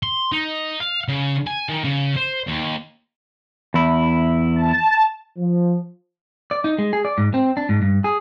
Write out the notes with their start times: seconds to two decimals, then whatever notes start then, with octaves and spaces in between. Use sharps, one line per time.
0.03 C6
0.32 D#4
0.80 F5
1.08 C#3
1.46 G#5
1.69 D#3
1.84 C#3
2.16 C5
2.47 D#2
3.74 E2 E4
4.56 A5
5.37 F3
6.51 D5
6.64 D#4
6.78 G#3
6.93 G#4
7.05 D5
7.18 G#2
7.34 C4
7.57 D4
7.69 G#2
7.82 G2
8.04 G#4